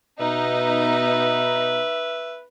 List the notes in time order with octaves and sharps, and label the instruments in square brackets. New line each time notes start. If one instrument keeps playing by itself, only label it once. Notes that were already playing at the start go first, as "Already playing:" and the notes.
[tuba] B2 [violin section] B3 D#4 [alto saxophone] B4 [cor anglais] E5